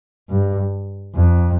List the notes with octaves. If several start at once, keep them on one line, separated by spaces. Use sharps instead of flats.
G2
F2